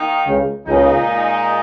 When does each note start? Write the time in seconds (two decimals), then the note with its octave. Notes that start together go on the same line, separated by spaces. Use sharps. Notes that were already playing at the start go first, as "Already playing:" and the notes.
Already playing: D#3 A#3 D#4 G4
0.27 C#2 C#3
0.66 C#2 A#2 C#3 G#3 D#4